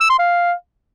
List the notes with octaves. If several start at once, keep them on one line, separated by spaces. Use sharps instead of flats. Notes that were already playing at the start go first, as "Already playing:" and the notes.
E6
C6
F5